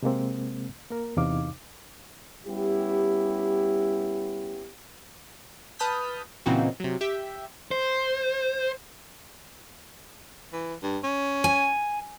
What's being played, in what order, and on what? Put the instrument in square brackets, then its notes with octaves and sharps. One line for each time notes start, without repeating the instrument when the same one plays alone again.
[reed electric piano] C3 G#3 A#3 C4
A#3 A#4
E2 C3 D#4 F5 D6
[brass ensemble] G3 B3 C#4 E4 G4
[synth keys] B4 A5 D#6 F6 G6 B6
A#2 C#3 E3 C4 D#4 F#4
C3 F#3
G4 E5 G5
[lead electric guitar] C5
[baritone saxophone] E3
G2
C#4
[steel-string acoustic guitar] G#5